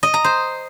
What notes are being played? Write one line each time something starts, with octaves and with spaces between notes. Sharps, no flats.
D#5
A#5
C5